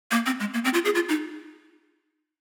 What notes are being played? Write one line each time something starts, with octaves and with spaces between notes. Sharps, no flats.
A#3
C4
G#3
A#3
C4
F4
G#4
F4
D#4